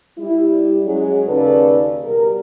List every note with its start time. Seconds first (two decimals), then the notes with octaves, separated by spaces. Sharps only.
0.18 G3 E4
0.85 F#3 G#3 C#4 G#4
1.27 D#2 C#3 A4 B4 D5
2.04 B2 G3 A#4